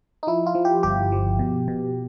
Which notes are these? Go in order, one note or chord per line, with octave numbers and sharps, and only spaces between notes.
D#4
F3 E4
F4
F3
G4
G1 G4
F3
B2
B2